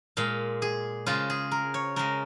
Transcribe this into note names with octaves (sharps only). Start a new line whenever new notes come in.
A#2 G#3 F5
G#4
C#3 G#3 F4
G#4
A#4
C#5
C#3 G#3 A#4